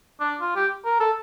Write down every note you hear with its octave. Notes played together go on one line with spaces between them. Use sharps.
D4
F4
G4
A#4
A4